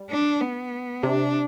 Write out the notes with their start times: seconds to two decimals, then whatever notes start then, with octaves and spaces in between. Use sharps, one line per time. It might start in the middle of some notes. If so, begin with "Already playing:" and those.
Already playing: G3
0.11 D4
0.41 B3
1.03 C3 D4